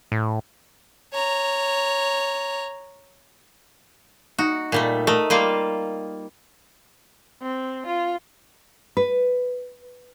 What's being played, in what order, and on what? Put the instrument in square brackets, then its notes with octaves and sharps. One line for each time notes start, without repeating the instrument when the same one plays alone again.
[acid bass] A2
[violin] C#5 A#5
[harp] D#4 [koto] F#4
[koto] A#2 G3 A3
[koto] A3 [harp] A#4 D#5
[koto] G3 A#3 F4
[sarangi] C4
F4
[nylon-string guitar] B4